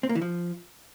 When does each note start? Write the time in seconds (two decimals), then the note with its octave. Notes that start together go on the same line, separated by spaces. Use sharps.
0.03 C4
0.09 A#3
0.15 E3
0.21 F3